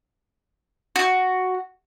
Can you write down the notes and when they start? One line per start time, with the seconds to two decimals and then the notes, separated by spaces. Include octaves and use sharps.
0.96 F#4